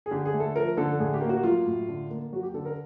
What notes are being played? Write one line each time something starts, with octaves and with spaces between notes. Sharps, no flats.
G#4
D3 G4
G#4
A3
A4
F3 A#4
D3 A4
A2 G#4
G4
A#3
F#4
F#3 F4
A2
D3
A#3
F#3 F#4
G4
D3 A4
A#4